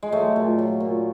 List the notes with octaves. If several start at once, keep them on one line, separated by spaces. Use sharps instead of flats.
G#3
F#3 A3
A#2
F#3
A#2